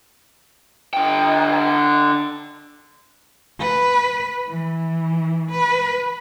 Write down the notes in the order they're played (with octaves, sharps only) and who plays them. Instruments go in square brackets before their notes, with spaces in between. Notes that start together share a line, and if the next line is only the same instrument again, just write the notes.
[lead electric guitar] D3 G5
[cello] B4
E3
B4